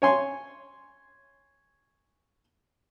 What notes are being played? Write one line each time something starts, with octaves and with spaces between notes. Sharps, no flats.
C#5 G#5 C6